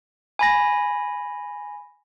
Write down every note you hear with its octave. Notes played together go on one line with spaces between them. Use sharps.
G#5 B5 A#6